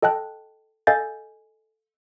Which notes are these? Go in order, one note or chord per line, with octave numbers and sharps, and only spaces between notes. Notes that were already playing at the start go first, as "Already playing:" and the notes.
A4 D#5 G5 A5 F#6
A4 D#5 F5 G#5 G6 A6